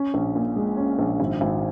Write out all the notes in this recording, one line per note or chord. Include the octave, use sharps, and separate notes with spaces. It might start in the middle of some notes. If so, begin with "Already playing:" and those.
Already playing: C#4
A#1
A#2
G#3
C#4
A#1
G#1
G#1